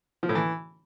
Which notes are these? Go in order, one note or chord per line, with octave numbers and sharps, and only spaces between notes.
F3
A2
E3